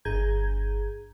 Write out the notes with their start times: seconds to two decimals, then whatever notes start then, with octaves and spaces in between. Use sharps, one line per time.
0.05 G1 G#4 A#5 G6 G#6